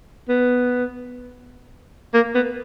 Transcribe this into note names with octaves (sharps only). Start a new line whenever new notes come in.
B3
A#3
B3